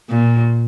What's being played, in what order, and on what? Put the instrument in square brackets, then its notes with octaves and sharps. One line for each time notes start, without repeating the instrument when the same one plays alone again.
[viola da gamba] A#2